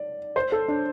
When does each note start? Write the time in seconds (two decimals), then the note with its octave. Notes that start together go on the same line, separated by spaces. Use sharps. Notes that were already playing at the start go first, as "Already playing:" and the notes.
Already playing: D5
0.36 C5
0.52 A4
0.68 D4